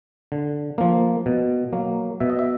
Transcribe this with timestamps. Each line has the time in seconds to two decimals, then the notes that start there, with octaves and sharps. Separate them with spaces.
0.32 D3
0.78 F3 A#3
1.26 B2
1.73 F#3 A#3
2.20 B2 E5
2.30 D#5
2.39 E5